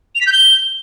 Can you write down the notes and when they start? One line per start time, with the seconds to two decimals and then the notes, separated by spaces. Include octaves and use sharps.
0.15 F7
0.21 B6
0.27 G6
0.32 G7